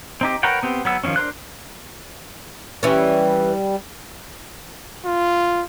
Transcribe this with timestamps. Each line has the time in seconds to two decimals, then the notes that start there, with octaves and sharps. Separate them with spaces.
0.21 C4 D#4 G4
0.43 A#4 B4 C#5 F#5 G5
0.63 B3 C4 G4
0.85 F#3 B3 E6
1.03 D#3 F3 G#3 C4 C#4
1.16 D4 A#4 C5 F#6
2.83 E3 G3 C#4
5.06 F4